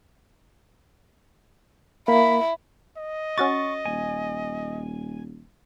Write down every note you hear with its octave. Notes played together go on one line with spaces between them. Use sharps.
A#3 E4 B5
D#5
C#4 F#4 C#6 A6
D#1 G#5